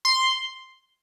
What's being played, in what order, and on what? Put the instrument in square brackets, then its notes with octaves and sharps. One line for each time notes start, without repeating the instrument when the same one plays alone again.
[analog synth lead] C6